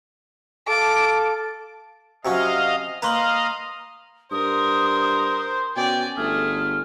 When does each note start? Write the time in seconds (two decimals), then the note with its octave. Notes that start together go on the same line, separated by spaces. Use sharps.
0.68 A4 F5 A5 D6
2.25 C3 F#3 C#4 D#5 F5
3.02 A#3 B4 D#5 F5 A#5 C6 F#7
4.32 G2 A#4 C5 D#6
5.76 B2 C#4 D5 G5 G#5
6.17 G1 A3 G#4 F6